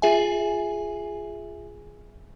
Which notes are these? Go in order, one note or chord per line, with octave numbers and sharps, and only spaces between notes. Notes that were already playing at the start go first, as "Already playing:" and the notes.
F4 G#4 E5 G#5